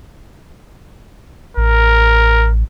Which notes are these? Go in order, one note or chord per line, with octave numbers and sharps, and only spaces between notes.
A1 A#4